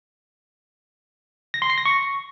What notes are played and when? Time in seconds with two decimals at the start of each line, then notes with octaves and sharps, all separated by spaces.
1.54 A#6
1.62 C6
1.70 C7
1.78 A#6
1.85 C#6